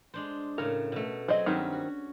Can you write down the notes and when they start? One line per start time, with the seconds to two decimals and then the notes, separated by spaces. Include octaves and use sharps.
0.14 G#3 D4 C5
0.58 A2 C#3 A#4 C#5
0.92 B2 A3
1.28 F#3 C4 G#4 C5 D#5
1.46 G2 D#3 F#3 C4 C#4
1.72 F#4